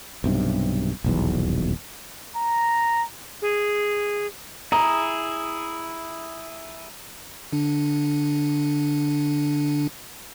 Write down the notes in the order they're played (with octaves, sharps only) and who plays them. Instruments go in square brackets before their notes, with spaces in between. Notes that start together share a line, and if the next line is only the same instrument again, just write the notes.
[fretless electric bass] B1 G2 C3
D#1 B1 E2
[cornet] A#5
[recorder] G#4
[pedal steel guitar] E4 G#4 D#6 [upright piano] A#5
[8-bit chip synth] D3 D4